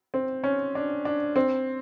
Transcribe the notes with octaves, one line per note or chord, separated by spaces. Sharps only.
C4
C#4
D4
D4
C4